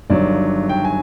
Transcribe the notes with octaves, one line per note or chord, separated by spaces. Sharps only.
G1 G2 D#3 F#3 D5
G5
G#5